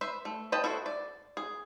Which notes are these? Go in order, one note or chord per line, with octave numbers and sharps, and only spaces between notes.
B4 C5 E5
A3
B4 D#5 G5 A5
E4 F#4 A4 C5
D5
G#4